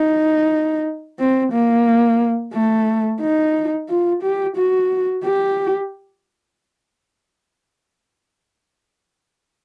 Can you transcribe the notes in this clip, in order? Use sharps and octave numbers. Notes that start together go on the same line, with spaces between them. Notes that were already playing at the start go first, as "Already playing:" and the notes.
Already playing: D#4
C4
A#3
A3
D#4
F4
G4
F#4
G4